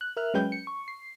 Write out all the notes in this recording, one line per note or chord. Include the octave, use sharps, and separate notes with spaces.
F#6
A#4 E5 F6 F#6
F#3 G#3 C#4 B4 G5 G6
C#7
C#6
C7